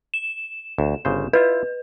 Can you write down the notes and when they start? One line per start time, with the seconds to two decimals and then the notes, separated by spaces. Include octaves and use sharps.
0.14 E7
0.78 D2
1.05 G1 C#3 C5
1.33 E4 F4 B4 E5